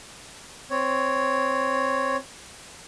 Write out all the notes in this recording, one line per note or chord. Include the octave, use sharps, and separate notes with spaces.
C4 C#5